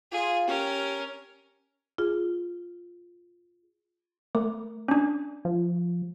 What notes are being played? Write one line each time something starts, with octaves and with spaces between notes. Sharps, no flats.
F4 G#4
C#4 G4 A#4
F4 G#4
A3 A#4
C#4 D4
F3